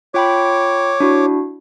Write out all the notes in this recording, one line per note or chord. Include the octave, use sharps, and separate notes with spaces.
F4 C#5 G5 B5 D6
D4 E4 F#4